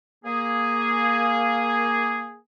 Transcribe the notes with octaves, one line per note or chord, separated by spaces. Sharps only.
A#3 G#4